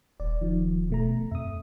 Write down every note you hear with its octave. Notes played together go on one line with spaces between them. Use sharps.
D#1 D5
D#3 F3
B2 A3 A#5
F2 E5 D#6